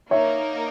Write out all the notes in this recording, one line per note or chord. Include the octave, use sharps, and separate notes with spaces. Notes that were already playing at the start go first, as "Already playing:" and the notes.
A#3 D#4 A#4 C#5 E5